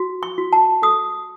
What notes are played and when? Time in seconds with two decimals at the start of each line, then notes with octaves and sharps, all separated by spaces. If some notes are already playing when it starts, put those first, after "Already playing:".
Already playing: F#4
0.23 C#6
0.38 F#4
0.53 A5
0.82 A4 D#6